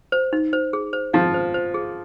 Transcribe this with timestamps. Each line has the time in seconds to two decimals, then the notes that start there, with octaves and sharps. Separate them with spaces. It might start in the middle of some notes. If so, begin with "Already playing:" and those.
0.12 C5
0.33 D#4
0.53 C5
0.73 G#4
0.93 C5
1.13 F3 F5
1.34 C5
1.54 C5
1.74 G#4